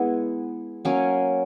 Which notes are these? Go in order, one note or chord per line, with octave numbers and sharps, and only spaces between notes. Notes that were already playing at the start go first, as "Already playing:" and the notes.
Already playing: G#3 B3 E4
F#3 A#3 C#4